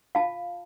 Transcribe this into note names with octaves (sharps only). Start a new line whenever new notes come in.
F4 F5 A5